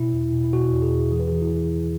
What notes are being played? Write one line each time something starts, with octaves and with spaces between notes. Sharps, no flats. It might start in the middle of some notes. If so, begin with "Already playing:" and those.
Already playing: B2 E4
E2
B2
E4
B2 F#4
E2
G#4
E2
E3 G#4
B4
E3 G#4
E4
E2
E2